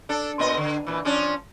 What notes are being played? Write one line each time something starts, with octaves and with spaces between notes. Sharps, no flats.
D4 A4
A#2 B3 D#5
D3
A#2 E3
F3 C#4 D4